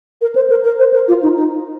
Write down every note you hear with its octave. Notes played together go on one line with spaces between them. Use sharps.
A#4
C5
A#4
A#4
C5
A#4
F4
D#4
D#4